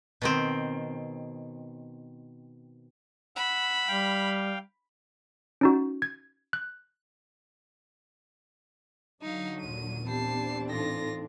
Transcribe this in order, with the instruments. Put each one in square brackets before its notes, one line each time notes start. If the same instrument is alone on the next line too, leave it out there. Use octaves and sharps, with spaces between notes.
[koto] B2 D#3 C4
[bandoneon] F#5 E6 [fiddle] B5
[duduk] G3 [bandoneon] F5 G5
[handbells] C#4 D#4 F#4
G#6
F#6
[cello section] D3 F#3 [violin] D#4 F5
[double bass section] D#2 A#2 [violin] D#7
[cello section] E3 C4 D4 [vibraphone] B3 G4 [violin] A5 C7
[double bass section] A2 [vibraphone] D#4 A4 [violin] F4 A#6